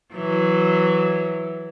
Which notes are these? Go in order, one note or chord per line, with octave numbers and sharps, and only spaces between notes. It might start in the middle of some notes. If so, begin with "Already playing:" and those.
E3 F#3